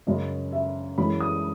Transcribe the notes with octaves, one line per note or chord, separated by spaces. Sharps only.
F#2 C#3 F#3 C#4 D#5
E5
F#2 E3 G#3 B5
D#6